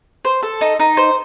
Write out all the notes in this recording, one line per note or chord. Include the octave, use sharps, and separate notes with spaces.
C5
A4
D#4
D#4
C5